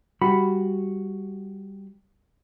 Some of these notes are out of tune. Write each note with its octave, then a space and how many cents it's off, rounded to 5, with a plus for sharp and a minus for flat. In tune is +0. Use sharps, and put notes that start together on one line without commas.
G3 +0 F#4 +0 B5 +0